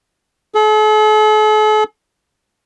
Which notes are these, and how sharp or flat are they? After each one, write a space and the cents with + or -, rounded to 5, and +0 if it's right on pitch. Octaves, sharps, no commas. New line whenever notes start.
A4 -45